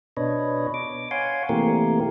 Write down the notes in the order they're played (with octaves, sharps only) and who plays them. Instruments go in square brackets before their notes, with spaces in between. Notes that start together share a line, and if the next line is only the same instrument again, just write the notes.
[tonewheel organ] B2 D4 B4 C#5 D#5
D6
C#5 F5 F#5 G#5 C6
C3 E3 A3 A#3 G4 A#4